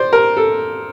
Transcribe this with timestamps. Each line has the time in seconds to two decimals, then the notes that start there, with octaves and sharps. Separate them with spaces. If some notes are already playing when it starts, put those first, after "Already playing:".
Already playing: C5 D5
0.13 A#4
0.37 A4